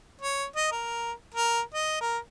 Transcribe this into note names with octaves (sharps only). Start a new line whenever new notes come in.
C#5
D#5
A#4
A#4
D#5
A#4